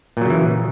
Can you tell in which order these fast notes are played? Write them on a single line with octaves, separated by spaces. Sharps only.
A#2 F#3 C#3 E3